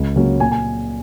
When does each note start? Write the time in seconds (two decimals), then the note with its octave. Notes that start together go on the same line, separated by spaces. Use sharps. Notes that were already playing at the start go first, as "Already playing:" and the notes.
Already playing: C#2
0.16 C#3 F#3 A#3 C#4
0.40 A#2 G#5
0.52 G#5